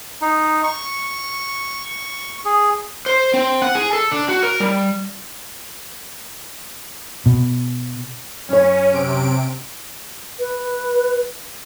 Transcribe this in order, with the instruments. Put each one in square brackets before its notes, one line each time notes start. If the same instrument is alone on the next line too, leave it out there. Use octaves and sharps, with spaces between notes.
[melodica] D#4
C#6
G#4
[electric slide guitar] C5
C4
F#5
G#4
A4
D4
F#4
A#4
G3
[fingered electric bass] B2
[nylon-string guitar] F#2 C#5 [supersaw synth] C#4
[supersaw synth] C3 D7
[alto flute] B4